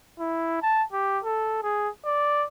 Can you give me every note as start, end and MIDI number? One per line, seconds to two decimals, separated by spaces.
0.19 0.60 64
0.62 0.83 81
0.92 1.19 67
1.24 1.58 69
1.63 1.89 68
2.05 2.46 74